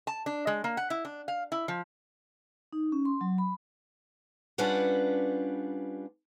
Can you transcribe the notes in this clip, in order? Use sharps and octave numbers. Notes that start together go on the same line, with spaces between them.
A5
D4
G#3
A#3
F#5
E4
D4
F5
E4
F3
D#4
C#4
C6
F#3
B5
G3 C#4 D4 F4 B4 F#5